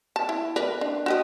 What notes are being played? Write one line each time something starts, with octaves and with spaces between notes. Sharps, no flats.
A5
E4
A#4 B4 D5
D4
F#4 G4 D#5